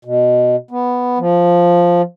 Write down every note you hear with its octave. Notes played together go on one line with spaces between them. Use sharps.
B2
B3
F3